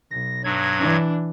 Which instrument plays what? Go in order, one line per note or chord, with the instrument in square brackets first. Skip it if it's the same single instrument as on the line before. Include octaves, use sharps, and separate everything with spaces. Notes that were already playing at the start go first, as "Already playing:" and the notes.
[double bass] B1 [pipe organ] A#6
[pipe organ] G2 F#3 G#6
[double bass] E3 D4